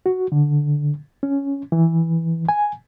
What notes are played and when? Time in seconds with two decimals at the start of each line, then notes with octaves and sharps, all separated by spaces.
0.06 F#4
0.32 D3
1.23 C#4
1.72 E3
2.49 G#5